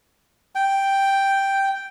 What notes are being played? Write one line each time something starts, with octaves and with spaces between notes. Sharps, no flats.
G5